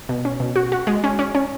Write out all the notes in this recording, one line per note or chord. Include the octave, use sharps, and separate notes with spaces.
B2
C#4
B2
F#4
F#4
G#3
C#4
C#4
C#4